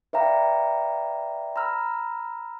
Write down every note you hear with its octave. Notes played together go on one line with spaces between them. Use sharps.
B4 D5 E5 F5 G5 A#5
A#5 B5 E6 F6